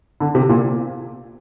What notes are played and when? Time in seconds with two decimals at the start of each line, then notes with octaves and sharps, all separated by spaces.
0.20 D3
0.35 C3
0.49 A#2